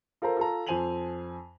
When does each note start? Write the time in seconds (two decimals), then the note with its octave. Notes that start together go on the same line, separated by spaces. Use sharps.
0.22 F4 A4 A#4 C5 A#5
0.37 F4 A4 A#5
0.67 F2 C5 G#5 D#7 F7 F#7